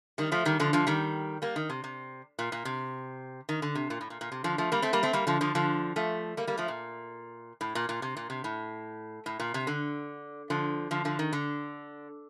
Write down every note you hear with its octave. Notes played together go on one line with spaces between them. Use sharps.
D#3 G3
F3 A3
D#3 G3
D3 F3
D3 F3
D#3 G3
G3 A#3
D#3
C3
C3
A#2
A#2
C3
D#3
D3
C3
A#2
A2
A#2
A#2
C3
D3 F3
F3 A3
G3 A#3
A3 C4
G3 A#3
A3 C4
G3 A#3
D3 F3
D3 F3
D3 F3
F3 A3
G3 A#3
G3 A#3
F3 A3
A#2
A2
A#2
A#2
C3
A#2
C3
A2
A2
A#2
C3
D3
D3 F3
D3 F3
D3 F3
D#3
D3